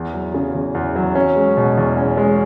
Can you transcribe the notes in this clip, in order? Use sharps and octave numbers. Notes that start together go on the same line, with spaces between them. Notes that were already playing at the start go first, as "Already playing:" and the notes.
Already playing: E2
F#3
C#3
E2
E2
F#3
C#4
G#3
B2
E2
C#4
G#3